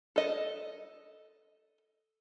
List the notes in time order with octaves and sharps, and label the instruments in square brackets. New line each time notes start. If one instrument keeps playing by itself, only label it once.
[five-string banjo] A4 D#5